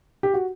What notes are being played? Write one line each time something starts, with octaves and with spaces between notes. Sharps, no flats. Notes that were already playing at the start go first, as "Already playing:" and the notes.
G4
F#4